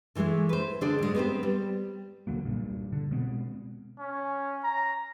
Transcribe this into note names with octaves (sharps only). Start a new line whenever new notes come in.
D3 E3 F#3 G#3 A3
B4 C5
D3 D4 G#4 C5 D5
G#2 G#3
B3 C4 G4 C5
G3
D2 D3 F#3 A#3
C2 G2 A#2
D3
B2 G#3 B3 C4
C#4
A#5